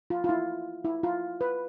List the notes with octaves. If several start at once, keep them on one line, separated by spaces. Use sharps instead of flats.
F4
F4
E4
E4
F4
B4